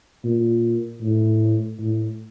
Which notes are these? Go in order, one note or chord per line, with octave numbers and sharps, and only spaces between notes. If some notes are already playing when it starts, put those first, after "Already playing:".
A#2
A2
A2